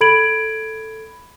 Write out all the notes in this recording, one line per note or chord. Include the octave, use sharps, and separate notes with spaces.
A4 B5 G#6 D7 F#7